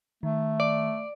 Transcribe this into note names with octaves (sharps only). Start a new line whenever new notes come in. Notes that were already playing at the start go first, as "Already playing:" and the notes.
D#3 A3
D5